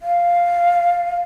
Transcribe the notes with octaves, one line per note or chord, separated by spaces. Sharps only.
F5